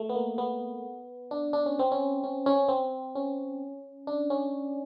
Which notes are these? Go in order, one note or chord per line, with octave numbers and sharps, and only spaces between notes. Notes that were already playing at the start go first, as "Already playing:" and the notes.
Already playing: A3
B3
A#3
B3
D4
D4
C#4
C4
C#4
C#4
C#4
C4
C#4
D4
C#4